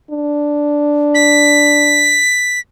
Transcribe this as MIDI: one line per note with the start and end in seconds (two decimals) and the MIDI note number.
0.11 2.25 62
1.15 2.60 95